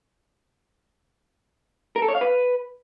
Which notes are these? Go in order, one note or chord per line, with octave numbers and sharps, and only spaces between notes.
A#4
A4
C#5
F5
B4